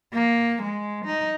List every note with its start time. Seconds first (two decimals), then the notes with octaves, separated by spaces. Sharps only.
0.13 A#3
0.62 G#3
1.05 D#4